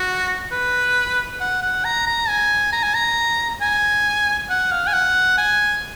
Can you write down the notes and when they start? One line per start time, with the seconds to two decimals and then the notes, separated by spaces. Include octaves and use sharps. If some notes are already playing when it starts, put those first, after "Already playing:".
Already playing: F#4
0.52 B4
1.41 F#5
1.63 F#5
1.85 A#5
2.07 A#5
2.28 G#5
2.73 A#5
2.83 G#5
2.94 A#5
3.61 G#5
4.50 F#5
4.72 F5
4.87 G#5
4.93 F#5
5.38 G#5